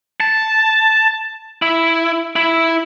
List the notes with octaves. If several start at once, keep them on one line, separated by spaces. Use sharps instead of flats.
A5
E4
E4